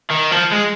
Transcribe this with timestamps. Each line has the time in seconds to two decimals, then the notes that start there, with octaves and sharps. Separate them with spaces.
0.11 D#3
0.32 F3
0.52 G#3